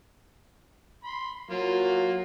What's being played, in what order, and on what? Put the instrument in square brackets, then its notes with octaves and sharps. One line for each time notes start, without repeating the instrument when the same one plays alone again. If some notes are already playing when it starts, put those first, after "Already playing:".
[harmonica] B5 C6
[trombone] F#3 [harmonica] A#3 F4